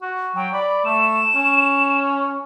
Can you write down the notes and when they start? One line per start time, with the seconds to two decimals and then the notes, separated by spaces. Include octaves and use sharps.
0.02 F#4
0.35 F#3 G5
0.53 D5 B5
0.85 A3 E7
1.35 C#4